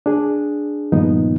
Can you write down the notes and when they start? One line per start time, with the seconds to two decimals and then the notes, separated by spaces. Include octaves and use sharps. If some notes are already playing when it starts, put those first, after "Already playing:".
0.06 D4 G#4
0.92 G2 A#2 D#3 F3 B3 D#4